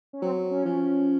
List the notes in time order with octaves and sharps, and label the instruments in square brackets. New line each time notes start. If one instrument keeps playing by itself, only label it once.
[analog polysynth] C#4
[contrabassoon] F#3 [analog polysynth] C4
[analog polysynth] C#4
[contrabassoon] F3
[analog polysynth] C#4